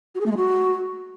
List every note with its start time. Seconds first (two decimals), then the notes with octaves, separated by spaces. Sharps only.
0.15 F#4
0.20 G#4
0.26 A3
0.31 G#3
0.37 F#4